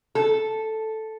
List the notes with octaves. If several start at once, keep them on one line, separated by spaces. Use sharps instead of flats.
A4